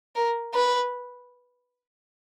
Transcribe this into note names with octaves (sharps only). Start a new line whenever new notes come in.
A#4
B4